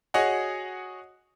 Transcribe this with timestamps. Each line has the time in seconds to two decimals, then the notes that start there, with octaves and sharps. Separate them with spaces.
0.14 F#4 G#4 C#5 D#5 F#5